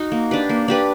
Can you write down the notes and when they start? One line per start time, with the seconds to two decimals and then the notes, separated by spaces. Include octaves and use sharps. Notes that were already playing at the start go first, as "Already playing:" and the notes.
Already playing: D#4 F#4
0.12 A#3
0.31 D4 G4 B4
0.49 A#3
0.68 D4 G4 B4